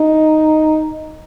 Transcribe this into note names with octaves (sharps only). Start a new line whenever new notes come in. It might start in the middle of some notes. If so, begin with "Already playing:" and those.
Already playing: D#4